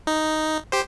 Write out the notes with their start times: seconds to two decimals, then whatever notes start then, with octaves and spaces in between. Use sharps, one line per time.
0.07 D#4
0.72 G4 C5